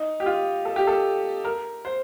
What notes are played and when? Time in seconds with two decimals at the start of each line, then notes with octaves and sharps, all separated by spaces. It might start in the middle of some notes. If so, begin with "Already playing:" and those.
Already playing: D#4
0.20 G4
0.26 F4
0.65 A4
0.76 G4
0.87 A4
1.44 A#4
1.85 C5